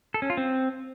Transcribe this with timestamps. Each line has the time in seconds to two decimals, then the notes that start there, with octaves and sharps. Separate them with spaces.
0.14 A4
0.22 C#4
0.30 F4
0.37 C4